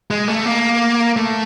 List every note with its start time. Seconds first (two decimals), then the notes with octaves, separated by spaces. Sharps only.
0.11 G#3
0.28 A3
0.46 A#3
1.17 A3